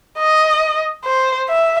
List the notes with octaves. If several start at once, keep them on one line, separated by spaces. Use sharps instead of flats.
D#5
C5
E5